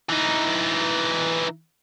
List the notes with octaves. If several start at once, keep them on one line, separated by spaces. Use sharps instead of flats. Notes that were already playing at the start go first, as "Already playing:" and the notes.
E3 D#4